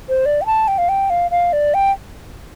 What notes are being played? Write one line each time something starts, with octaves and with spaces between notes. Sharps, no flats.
C5
D5
G5
A5
G5
F5
G5
F5
F5
D5
G5